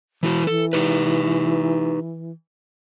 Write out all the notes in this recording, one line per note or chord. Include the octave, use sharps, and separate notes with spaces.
E3 E4 F#4
E3 A4
D#4 G4 B4